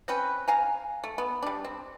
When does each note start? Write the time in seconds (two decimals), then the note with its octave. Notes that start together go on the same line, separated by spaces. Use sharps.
0.08 C4 C#4 B4 G5
0.48 F5 G#5 A#5
1.04 A3
1.18 B3
1.43 G3 D4
1.65 C4